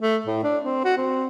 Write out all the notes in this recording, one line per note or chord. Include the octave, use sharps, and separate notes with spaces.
A3
A2
D4
C4
F#4
C4